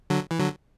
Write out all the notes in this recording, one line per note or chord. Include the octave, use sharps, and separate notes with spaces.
D3 F#3
E3
D3 F#3